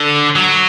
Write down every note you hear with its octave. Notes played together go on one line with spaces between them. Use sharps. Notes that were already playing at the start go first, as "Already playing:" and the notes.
Already playing: D3
F#3